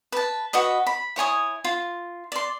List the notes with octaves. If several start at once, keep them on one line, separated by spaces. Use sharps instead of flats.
B4 A5
F#4 B4 D#5 B5
B5
E4 C#5 G#5 D#6
F4
D5 C6